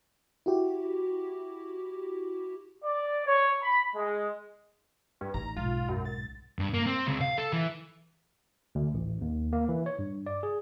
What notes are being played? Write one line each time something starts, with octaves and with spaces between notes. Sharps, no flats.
E4 F#4 G4
D5
C#5
B5
G#3
G2
A1 D#4 A#5
B1 G#2 F4
F#2
A6
G2
A#3
C4
C#2
F5
A4
E3
D2
A1
D#2
A#3
E3
C#5
G2
D5
G#4